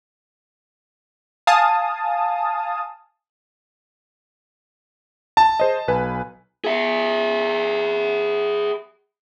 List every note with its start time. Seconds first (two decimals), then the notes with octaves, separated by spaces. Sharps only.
1.47 F5 G#5 A5 D#6
5.37 A5
5.60 G#4 C5 D#5
5.88 B1 B4 G#5
6.64 G#4 E5